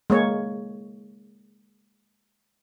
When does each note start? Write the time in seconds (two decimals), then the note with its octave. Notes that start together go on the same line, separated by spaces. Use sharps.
0.10 G#3 A#3 C#5